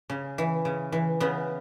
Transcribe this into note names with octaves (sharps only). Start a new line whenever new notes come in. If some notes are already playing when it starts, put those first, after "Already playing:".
C#3
E3
C#3
E3
C#3 B3